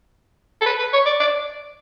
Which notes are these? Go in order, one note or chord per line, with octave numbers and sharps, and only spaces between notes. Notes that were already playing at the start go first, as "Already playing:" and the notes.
A4
B4
B4
C#5
D5
D5